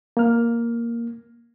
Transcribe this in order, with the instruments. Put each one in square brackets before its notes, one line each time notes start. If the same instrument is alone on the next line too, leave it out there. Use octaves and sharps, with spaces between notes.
[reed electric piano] A#3 F6